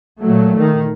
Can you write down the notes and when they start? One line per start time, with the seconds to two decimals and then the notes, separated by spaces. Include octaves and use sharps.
0.21 A#2 F#3 A3
0.58 D#3